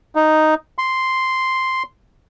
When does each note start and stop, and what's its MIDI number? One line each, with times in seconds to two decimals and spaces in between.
0.15 0.54 63
0.78 1.83 84